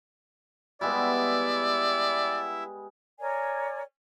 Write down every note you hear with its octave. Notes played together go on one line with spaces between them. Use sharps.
G3 G#3 B3 E4 D5 E5
A#4 C#5 D5 G#5